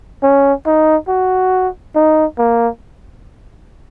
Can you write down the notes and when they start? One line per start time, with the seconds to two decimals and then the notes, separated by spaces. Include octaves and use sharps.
0.23 C#4
0.66 D#4
1.08 F#4
1.95 D#4
2.38 A#3